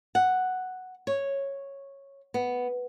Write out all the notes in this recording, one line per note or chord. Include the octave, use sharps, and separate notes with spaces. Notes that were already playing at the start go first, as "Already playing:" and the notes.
F#5
C#5
B3